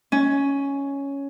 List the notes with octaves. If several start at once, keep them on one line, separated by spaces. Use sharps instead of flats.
C#4